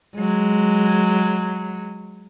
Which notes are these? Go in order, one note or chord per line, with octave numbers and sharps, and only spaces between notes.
F#3 G#3